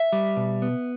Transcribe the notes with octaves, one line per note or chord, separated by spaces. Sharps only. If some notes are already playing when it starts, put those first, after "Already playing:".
Already playing: E5
G3
B2
B3